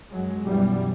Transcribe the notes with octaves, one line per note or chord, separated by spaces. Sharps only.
F#2 F#3 G#3
B1 F#2 B2 E3 F#3 G3